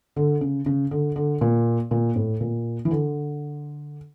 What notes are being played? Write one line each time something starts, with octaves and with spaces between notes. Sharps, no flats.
D3
C#3
C#3
D3
D3
A#2
A#2
A2
A#2
E3
D3